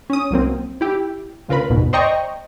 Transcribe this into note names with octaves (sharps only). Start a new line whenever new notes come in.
C#4 D#6
C2 F#3 A#3 C4
E4 G4
D2 C#3 F4 A#4 B4 B5
G1 D#2 G#2 B2
C5 D5 D#5 G5 A#5 C#6